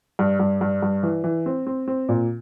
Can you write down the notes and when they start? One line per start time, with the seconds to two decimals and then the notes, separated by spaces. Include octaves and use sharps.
0.19 G2
0.40 G2
0.61 G2
0.82 G2
1.03 E3
1.24 E3
1.46 C4
1.67 C4
1.88 C4
2.09 A#2